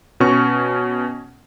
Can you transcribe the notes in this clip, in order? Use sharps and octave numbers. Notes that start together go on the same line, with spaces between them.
B2 C#4 C#6